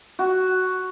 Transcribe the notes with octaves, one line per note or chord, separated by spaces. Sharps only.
F#4